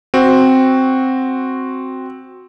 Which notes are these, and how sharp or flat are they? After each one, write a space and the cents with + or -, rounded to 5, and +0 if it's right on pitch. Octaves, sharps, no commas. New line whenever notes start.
C4 +0 F#4 +0